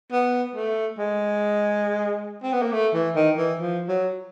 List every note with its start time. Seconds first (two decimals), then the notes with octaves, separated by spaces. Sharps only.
0.12 B3
0.55 A3
0.98 G#3
2.43 C4
2.53 B3
2.62 A#3
2.72 A3
2.94 E3
3.15 D#3
3.37 E3
3.59 F3
3.88 F#3